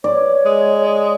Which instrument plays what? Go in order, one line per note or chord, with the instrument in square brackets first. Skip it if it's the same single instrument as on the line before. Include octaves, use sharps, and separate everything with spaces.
[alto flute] C#5 [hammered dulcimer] D5
[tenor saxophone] G#3